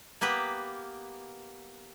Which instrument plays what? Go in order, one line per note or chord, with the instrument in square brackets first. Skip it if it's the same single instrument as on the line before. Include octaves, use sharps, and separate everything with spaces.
[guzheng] A#3 B3 G4 B4